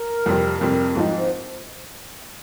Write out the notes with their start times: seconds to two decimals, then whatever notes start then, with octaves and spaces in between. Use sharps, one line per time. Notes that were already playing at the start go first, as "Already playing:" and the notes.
Already playing: A#4
0.26 F2 C3 G3 C4
0.61 F2 C3 G3 C4
0.95 G#2 F3 C4 D#4
1.18 C5